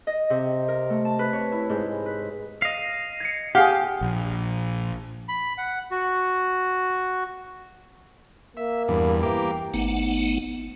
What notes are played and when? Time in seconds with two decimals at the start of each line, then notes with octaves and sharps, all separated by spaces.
0.07 D#5
0.30 C3
0.68 A#4
0.90 A3
1.05 A5
1.19 B4
1.33 C#5
1.52 E4
1.70 G#2
2.06 B4
2.62 D#5 F5
3.20 G#6 C7 C#7
3.55 G4 G#4 F5 F#5
4.01 A#1
5.29 B5
5.58 F#5
5.91 F#4
8.57 A#3 E5
8.88 E2 G2
9.23 E3 A#3 G4
9.74 G#1 A3 B3 D#4 F#5